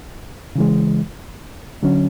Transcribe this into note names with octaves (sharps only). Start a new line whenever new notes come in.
C#3 E3 G#3
D3 F#3 C#4